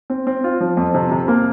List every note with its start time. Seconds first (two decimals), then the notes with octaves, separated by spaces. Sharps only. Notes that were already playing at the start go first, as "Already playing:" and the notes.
0.10 C4
0.27 C4
0.44 F4
0.60 F3
0.77 F2
0.94 C3
1.12 C3
1.28 A#3